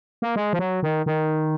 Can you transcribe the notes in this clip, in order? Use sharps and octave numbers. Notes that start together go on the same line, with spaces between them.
A#3
G#3
F3
F#3
D#3
D#3